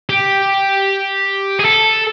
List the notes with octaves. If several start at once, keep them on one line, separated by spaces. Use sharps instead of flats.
G4
G#4
A4